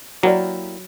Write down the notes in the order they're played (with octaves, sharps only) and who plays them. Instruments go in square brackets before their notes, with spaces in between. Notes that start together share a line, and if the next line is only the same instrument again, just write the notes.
[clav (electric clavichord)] F#3 [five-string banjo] A#3 E4 G4 A#4 D5